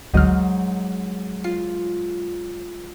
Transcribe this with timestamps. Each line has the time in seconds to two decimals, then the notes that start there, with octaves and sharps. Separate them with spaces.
0.13 G#1 D2 G#2 F#3 D#5 F6
1.44 F4 C7